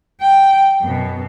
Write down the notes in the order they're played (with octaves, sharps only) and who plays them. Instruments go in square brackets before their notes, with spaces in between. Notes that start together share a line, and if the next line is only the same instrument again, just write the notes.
[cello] G5
F#2 B2